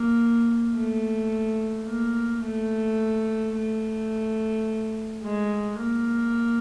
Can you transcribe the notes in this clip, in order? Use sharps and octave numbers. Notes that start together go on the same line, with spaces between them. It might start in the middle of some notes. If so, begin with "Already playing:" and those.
Already playing: A#3
A3
A#3
A3
A3
G#3
A#3